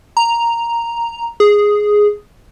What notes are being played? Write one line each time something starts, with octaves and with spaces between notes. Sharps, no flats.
A#5
G#4